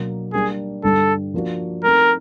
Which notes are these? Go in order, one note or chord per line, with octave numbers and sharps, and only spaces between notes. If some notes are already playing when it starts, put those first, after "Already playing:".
Already playing: B2 F#3 A#3 D4
G3 A#3 D4 G#4
G2 D3 G3 A4
F3 A#3 D4 F#4
A3 C4 D#4 A#4